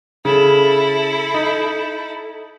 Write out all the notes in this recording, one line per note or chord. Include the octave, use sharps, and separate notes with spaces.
C#3 E4 A4
D#4